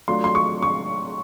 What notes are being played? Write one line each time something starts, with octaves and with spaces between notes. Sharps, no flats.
F#3 A3 D4 F4 C6
C6
C#6
C#6